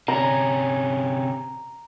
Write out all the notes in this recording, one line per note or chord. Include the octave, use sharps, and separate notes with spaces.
C3 C#4 A#5